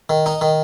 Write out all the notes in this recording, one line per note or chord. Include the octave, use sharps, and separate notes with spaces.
D#3
D#4
D#3